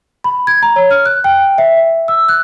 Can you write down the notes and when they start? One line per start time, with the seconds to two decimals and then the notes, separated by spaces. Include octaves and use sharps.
0.24 B5
0.47 G#6
0.63 A#5
0.76 C#5
0.91 F6
1.06 F#6
1.24 G5
1.58 E5
1.77 E5
2.08 E6
2.29 F#6